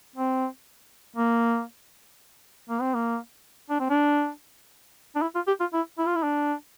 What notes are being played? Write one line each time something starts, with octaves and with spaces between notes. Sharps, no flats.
C4
A#3
A#3
C4
A#3
D4
C4
D4
D4
E4
F4
G4
F4
E4
E4
F4
E4
D4